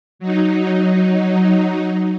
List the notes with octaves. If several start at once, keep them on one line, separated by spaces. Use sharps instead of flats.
F#3 D#4